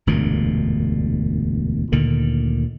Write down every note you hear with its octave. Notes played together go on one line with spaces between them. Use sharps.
E1 D2 G2 A#2
D2 A#2 D3 D#3